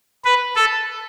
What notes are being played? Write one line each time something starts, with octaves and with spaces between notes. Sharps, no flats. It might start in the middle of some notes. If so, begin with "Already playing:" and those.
B4
A4